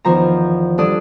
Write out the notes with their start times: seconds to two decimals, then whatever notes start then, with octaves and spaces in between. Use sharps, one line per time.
0.05 E2 D#3 F3 A#5
0.78 G2 D4 A4 D5 D#6 F#6